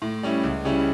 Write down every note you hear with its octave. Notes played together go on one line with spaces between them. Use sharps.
A2
G3 C#4 E4
C#2
C#3 G3 C#4 E4